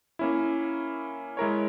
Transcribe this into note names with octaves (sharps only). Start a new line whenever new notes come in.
A#3 C#4 E4
G#3 E4 A#4 C#5